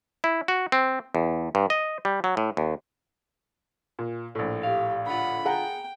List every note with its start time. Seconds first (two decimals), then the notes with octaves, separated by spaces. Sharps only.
0.24 E4
0.48 F#4
0.72 C4
1.15 E2
1.55 G2
1.70 D#5
2.05 G3
2.24 F#3
2.37 A2
2.57 D#2
3.99 A#2
4.35 A#1 A2
4.63 G4 F5
5.06 D3 F4 F#5 B5
5.45 G#4 F#5 G5 A#5